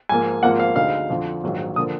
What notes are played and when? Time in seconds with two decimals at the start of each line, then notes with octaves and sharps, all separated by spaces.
0.09 G#2 F3 A#3 G#5
0.43 G#1 G#2 F3 A#3 F4 F#5
0.59 F5
0.76 D2 D3 G#3 D#4 F5
1.10 F2 D3 F3
1.43 A#1 G#2 D#3 F#3
1.76 D3 F3 A#3 D#6